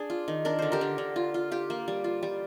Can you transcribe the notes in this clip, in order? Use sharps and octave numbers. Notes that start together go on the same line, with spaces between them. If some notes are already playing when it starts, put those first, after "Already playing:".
Already playing: D4 G#4
F4
D#3
D4 A#4
D3 C5
G4 A#4
D3
D3
F4
F4
F4 G4
A#3
G3
F4
G3